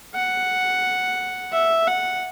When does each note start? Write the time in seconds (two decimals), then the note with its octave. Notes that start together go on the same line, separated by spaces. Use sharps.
0.15 F#5
1.53 E5
1.87 F#5